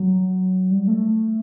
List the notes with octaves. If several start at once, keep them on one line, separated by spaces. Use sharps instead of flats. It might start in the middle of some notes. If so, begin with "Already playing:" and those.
Already playing: F#3
G3
A3